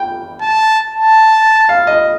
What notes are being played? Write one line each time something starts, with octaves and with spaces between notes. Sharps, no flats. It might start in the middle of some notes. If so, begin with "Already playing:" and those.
Already playing: G5
A5
A5
F5
D#5